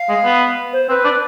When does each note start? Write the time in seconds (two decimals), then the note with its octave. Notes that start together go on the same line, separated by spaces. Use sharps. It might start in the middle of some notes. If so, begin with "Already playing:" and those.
Already playing: F5
0.09 G#3
0.24 B3
0.73 C5
0.89 C4 B4
1.04 D4